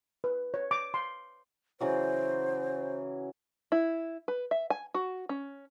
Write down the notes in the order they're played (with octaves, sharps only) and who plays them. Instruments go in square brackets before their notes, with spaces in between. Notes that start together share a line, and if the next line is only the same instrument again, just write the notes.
[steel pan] B4
C#5
D6
C6
[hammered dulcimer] C#3 E3 F#3 [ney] C5
[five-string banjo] E4
B4
E5
G#5
F#4
C#4